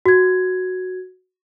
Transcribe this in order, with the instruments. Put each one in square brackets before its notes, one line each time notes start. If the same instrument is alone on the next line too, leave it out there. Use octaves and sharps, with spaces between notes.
[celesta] F#4 G#6